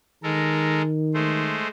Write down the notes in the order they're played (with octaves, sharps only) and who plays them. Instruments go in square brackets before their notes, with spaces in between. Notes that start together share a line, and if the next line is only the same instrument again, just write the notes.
[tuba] D#3 [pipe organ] G#3 A4 A#4
[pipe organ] G#3 A3 C5